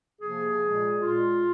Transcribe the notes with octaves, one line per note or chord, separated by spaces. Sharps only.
C3 F3 A#3 G#4
A#2 G#3
A#2 G#3 F4